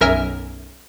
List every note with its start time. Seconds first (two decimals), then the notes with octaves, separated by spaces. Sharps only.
0.01 B1 F#2 A#4 E5 G#5 F6